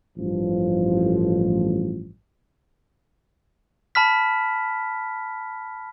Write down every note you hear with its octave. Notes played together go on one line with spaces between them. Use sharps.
A1 G2 F3
A5 B5 F6 B6